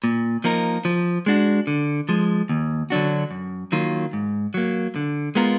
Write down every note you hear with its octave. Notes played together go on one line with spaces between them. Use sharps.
A#2
F3 A#3 D#4 A#4
F3
G#3 D4 F#4
D3
F3 G#3
D#2
D3 F#3 D4 F#4
F#2
D#3 F#3 A#3 F4
G#2
F#3 A#3
D3
G#3 B3 F4 A#4